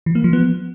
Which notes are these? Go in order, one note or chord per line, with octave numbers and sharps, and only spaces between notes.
E3
A#3
F3
B3